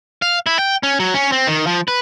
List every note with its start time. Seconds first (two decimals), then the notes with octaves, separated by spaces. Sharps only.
0.22 F5
0.46 E4
0.59 G5
0.83 C#4
1.00 F#3
1.14 C#4
1.32 C4
1.47 D#3
1.67 F3
1.88 B4